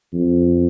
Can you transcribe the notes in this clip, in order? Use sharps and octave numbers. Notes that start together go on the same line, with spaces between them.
F2